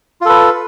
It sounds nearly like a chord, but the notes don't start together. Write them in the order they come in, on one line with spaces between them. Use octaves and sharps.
F4 A4 B4